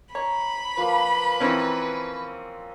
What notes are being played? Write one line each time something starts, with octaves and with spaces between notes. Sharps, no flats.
C#5 A#5 B5
F3 A#3 B4
E3 C4 C#4